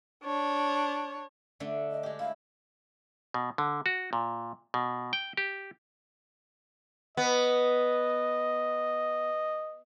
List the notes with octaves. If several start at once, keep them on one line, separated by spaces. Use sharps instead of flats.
D4 C#5
D3 A3 D4
D#5
G#3 G4
E4 F5
B2
D3
F#4
A#2
B2
G5
G4
B3 D#5